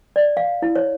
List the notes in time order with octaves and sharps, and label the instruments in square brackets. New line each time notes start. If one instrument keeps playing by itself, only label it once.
[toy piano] D5
F5
E4
C#5